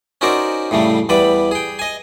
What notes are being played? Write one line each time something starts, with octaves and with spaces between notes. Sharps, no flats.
C#4 D#4 F#4 A#4 C5 D5
A2 C#3 G3 A3
E2 G3 B4 D5 B5
G#4 G5
D#5 G#5